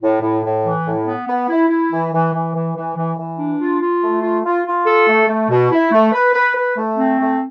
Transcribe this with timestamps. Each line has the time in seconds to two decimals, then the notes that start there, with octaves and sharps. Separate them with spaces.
0.01 A2
0.21 A2
0.43 A2
0.65 E3
0.85 A2
1.06 B3
1.27 B3
1.49 E4
1.69 E4
1.90 E3
2.12 E3
2.33 E3
2.54 E3
2.75 E3
2.96 E3
3.17 E3
3.38 D4
3.60 F4
3.81 F4
4.02 A3
4.22 F4
4.44 F4
4.65 F4
4.86 A4
5.08 A3
5.28 A3
5.49 B2
5.71 E4
5.92 A3
6.13 B4
6.34 B4
6.55 B4
6.76 A3
6.97 C4
7.19 A3